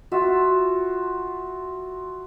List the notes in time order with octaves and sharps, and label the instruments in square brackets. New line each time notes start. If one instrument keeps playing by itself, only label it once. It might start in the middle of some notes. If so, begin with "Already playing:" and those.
[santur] F4 F#4 E5 F5